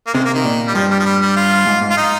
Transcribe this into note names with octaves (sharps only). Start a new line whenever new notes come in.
A#3
C3 G#3
A#3
D#3
A#2
G3
G2 F3
G3
F3
G3
G3
F4
G#2
G#2
F4
D#4